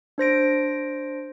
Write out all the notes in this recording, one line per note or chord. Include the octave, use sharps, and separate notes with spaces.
D4 C5 A#6 D7